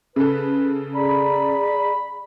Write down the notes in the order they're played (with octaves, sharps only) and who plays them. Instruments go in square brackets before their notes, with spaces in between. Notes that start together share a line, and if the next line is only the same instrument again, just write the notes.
[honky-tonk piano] C#3 A4 [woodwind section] B4
[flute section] G#4 D5 A#5 [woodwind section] B5